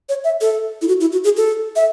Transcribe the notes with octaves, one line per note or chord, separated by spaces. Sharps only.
C#5
E5
A4
E4
F#4
E4
F#4
G#4
A4
E5